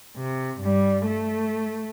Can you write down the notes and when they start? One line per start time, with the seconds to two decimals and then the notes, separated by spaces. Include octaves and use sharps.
0.17 C3
0.60 G2 G3
1.06 A3